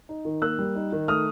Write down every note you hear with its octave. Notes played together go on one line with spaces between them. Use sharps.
D#4
D#3
A#3 E6 F#6
G3
D#4
D#3
A3 D#6 F6